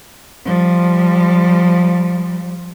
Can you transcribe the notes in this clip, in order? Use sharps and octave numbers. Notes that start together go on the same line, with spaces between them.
F3 G3